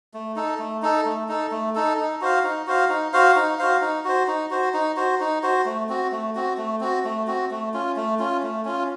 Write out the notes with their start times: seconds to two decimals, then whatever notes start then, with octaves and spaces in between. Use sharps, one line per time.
0.14 A3
0.36 D#4 A4
0.59 A3
0.82 D#4 A4
1.05 A3
1.28 D#4 A4
1.51 A3
1.75 D#4 A4
1.97 D#4
2.21 F#4 C5 F5
2.44 D#4
2.67 F#4 C5 F5
2.89 D#4
3.13 F#4 C5 F5
3.36 D#4
3.59 F#4 C5 F5
3.82 D#4
4.05 F#4 C5
4.28 D#4
4.51 F#4 C5
4.74 D#4
4.97 F#4 C5
5.20 D#4
5.43 F#4 C5
5.65 A3
5.89 C4 F#4
6.12 A3
6.35 C4 F#4
6.58 A3
6.81 C4 F#4
7.05 A3
7.27 C4 F#4
7.51 A3
7.74 C#4 F4
7.96 A3
8.19 C#4 F4
8.43 A3
8.65 C#4 F4